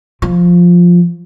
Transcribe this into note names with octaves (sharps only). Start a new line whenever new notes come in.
F3